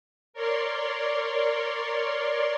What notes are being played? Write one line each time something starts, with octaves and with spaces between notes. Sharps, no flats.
A#4 C#5 D5 C6